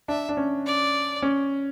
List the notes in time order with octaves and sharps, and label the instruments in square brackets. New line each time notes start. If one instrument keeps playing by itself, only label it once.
[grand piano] D4 [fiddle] E5
[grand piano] D4
C#4
[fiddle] D5
[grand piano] C#4